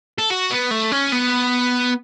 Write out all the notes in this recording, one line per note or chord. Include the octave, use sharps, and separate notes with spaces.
A4
F#4
B3
A3
C#4
B3